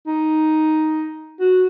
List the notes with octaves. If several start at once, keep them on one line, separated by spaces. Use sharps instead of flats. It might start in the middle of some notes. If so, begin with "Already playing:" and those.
D#4
F#4